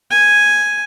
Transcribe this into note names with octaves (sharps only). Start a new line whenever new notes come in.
G#5